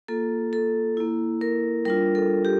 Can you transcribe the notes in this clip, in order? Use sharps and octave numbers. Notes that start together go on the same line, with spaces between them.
A#3 F4 A4
A4
A#3 E4
A#4
G3 D4 F4 A#4
A4
G4